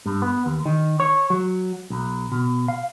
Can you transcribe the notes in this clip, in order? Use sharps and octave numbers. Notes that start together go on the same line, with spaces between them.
G2
B3
D#2
D#3
C#5
F#3
B1
B2
F5